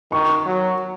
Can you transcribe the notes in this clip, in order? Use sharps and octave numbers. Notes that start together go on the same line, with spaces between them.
D#3 C#6
F#3